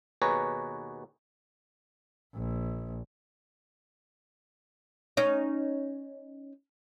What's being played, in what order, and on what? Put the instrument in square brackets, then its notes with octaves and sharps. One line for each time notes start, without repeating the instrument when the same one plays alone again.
[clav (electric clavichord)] D#2 B2 G#4 B4 C#5 A#5
[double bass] A#1
[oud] C#4 D#4